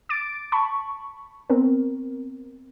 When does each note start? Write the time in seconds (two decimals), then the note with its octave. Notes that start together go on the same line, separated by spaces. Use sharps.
0.09 D6 A6 D7
0.52 A5 B5 C#6
1.50 B3 C4 A#4